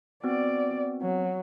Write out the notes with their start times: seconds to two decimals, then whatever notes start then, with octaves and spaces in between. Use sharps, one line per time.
0.24 B3 C4 F#4 D5
1.02 F#3